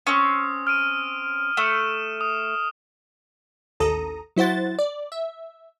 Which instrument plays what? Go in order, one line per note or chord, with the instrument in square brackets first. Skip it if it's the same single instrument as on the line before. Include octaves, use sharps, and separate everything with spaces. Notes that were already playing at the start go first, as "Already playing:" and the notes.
[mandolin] C4 C#4 [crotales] D#6
[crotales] F6 D7 D#7
[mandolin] A3 [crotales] F6 E7
[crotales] D#6
[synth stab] A1 D#2 A4 A#5 D#6
F#3 E4 C5 F#5 A6
D5
E5